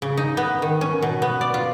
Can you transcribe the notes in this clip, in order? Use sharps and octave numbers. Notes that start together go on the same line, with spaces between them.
C#3
D#4
B3
D#3
C#4
B2
B3
D5
F4